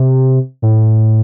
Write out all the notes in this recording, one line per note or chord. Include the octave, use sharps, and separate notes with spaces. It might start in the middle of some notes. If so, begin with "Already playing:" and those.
Already playing: C3
A2